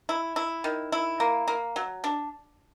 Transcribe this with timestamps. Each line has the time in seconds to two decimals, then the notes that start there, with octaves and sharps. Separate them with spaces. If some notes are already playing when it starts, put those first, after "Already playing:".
0.09 E4
0.36 E4
0.64 D#3
0.92 E4
1.20 A#3
1.48 A#3
1.76 F#3
2.04 D4